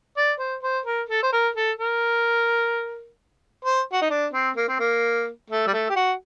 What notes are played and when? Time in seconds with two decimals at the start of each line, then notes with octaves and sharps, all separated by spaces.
0.17 D5
0.39 C5
0.63 C5
0.86 A#4
1.09 A4
1.23 C5
1.32 A#4
1.55 A4
1.79 A#4
3.65 C5
3.92 F#4
4.01 D#4
4.10 D4
4.33 C4
4.56 A#3
4.68 C4
4.79 A#3
5.50 A3
5.67 G3
5.73 A3
5.89 G4
5.96 F#4